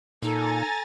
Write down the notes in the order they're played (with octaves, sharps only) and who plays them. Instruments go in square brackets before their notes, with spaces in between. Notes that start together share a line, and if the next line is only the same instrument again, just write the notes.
[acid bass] A#2 [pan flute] D#4 [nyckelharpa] A4 [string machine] G#5 A#5 A6